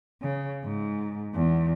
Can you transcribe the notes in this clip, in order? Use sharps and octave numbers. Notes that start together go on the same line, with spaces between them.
C#3
G#2
E2